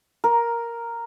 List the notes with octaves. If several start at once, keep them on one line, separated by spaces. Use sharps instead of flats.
A#4